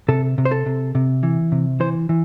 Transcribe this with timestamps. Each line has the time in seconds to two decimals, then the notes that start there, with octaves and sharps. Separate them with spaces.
0.08 C3 A4
0.38 C3
0.45 C5
0.51 A4
0.66 C3
0.95 C3
1.23 E3
1.52 C3
1.80 E3 C5
2.09 E3